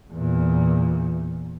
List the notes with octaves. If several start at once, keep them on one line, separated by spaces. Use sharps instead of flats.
E2 A#2